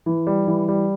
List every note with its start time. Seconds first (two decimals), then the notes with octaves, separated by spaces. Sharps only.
0.06 E3
0.27 G3
0.47 E3
0.69 G3